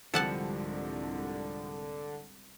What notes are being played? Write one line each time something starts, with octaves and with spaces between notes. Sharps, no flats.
C2 G#2 D3 F3 G3 A4 F#5 A5